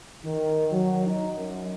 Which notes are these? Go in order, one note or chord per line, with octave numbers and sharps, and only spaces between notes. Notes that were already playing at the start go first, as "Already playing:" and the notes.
D#3
F#3
D#4
F#2